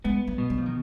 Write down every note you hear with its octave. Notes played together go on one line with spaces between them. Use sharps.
G#3 B3
G3
B2
G3
F3
D#3